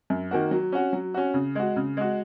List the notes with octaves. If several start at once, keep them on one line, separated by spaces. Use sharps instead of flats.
F#2
D#3 A#3 F#4
F#3
C#4 F#4
F#3
C#4 F#4
C#3
G#3 F#4
C#3
G#3 F#4